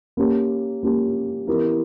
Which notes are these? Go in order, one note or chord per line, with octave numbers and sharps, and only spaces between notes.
A#3 C#4 G4
A#3 C#4 G4
E3 B3 E4 G4 A#4